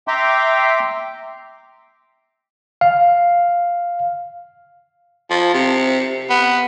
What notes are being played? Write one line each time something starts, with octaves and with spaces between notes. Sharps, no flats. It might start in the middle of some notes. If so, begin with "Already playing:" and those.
E5 G5 A#5 C6 D6
F5
F3
C3
B3